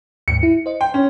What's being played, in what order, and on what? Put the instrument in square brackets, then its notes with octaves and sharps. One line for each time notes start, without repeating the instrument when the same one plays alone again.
[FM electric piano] D2 G#2 [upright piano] C#7
[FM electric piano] E4
C5 D#5
[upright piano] G5 [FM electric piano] C6
[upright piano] C#4